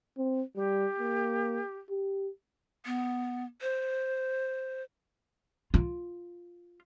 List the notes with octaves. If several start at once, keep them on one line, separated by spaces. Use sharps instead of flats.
C4
G3 G4
A#3
G4
B3
C5
F4